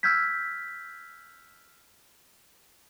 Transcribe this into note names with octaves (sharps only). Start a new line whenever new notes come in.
E6 F6 G6 G#6 B6